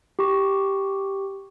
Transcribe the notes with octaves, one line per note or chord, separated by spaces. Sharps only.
G4 C#6